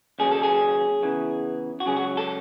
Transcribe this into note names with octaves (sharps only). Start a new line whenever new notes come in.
D#2 C#3 F#3 G#4
A4
G#4
E2 C#3 E3
F#4
C#2 C#3 F#3 G#4
F#4
A4